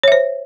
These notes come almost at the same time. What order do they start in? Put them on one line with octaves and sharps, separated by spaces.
C#5 E5 C5